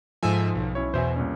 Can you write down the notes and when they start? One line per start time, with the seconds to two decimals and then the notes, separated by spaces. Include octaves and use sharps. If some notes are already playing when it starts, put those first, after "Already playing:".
0.23 G#2 F3 A4 E5 G#5
0.55 B1
0.75 C#4 E4 C#5
0.94 E2 B2 C5 E5 G#5
1.16 C2 A#2 C#4